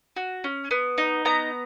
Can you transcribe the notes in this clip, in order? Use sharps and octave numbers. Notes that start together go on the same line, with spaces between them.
F#4
C#4
B3
D#4
B3 A#5